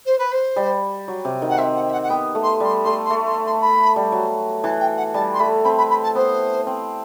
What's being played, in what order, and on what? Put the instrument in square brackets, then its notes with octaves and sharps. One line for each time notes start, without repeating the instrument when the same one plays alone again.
[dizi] C5
B4
C5
[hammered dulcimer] G3
F#3
C3
D#3
[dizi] F#5
[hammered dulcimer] C4 [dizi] E5
[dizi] F#5
E5
F#5
F#5
[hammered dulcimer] B3 [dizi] G5
[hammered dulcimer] A3
[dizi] C6
[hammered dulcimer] G3 [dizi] C6
[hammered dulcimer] A3 [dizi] C6
[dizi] C6
[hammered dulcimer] A3
[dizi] C6
C6
B5
[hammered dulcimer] G3
F#3
[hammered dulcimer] E3 [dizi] A5
[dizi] G5
F#5
[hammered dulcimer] G3 [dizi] A5
[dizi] C6
[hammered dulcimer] A3 [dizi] B5
[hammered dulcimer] C4 [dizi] B5
[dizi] B5
B5
A5
[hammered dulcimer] B3 [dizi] C5
[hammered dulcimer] C4